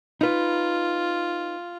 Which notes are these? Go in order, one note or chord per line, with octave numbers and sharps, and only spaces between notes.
D#4 F4 B4